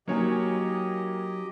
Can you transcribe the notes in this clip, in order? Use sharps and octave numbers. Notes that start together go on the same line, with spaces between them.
F#3 A#3 C#4 D#4 G4 C#5 D#5 G#5